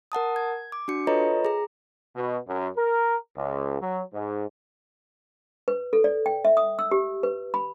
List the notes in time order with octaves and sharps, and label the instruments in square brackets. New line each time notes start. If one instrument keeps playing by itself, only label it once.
[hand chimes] A#4 F#5 A5 D#6
G#6
D6
D4 F#4 C#7
F4 A4 B4 C#5 D#5 A#5
G#4 A#5
[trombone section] B2
F#2
A#4
C#2
F#3
G#2
[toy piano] B4
A4
D5
G5
E5
D#6
E6
G4
B4
B5